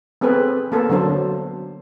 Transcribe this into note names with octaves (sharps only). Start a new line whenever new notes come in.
B3 C4 G#4 A4 B4
A#3 B3 A4 A#4
D3 F#3 D4 C5